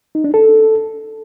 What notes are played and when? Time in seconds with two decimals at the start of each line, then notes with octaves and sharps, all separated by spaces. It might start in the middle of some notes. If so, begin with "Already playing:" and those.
0.15 D#4
0.24 D4
0.34 A4